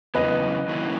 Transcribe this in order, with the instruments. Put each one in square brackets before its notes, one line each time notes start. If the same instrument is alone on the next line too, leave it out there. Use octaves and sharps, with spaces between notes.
[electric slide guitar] F#2 C#3 E3 B3 [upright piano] B4 D#5
[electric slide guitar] D#3 F#3 A#3 C#4 E4